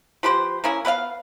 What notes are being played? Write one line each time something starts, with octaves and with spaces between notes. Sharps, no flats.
F3 G4 B4 C5
A#3 C#4 E4 G#4
B3 B4 D#5 F5